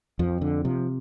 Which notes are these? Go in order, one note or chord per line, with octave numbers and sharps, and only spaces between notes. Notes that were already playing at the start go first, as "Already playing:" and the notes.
F2 F3
D3
C3 F3